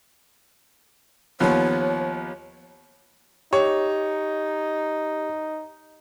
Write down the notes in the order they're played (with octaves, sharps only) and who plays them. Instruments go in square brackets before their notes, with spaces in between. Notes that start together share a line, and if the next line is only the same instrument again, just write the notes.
[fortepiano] D#2 F3 B3 [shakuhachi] C#5
[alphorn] D#4 [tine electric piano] G4 [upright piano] C#5